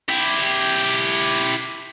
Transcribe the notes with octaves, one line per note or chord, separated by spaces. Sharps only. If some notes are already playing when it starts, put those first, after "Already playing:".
E4 G4